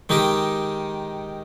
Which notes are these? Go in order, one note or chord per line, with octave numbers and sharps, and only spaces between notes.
D#3 G#3 D#4 G4 A#4